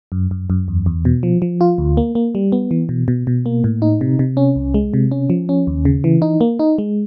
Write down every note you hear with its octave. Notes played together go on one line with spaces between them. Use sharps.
F#2
F#2
F#2
E2
E2
B2
F3
F3
F4
D2
A#3
A#3
G3
B3
E3
B2
B2
B2
A#3
A2
D#4
C3
C3
C#4
C2
G#3
C3
C#4
F3
C#4
D#2
C#3
E3
D#4
A#3
D#4
G#3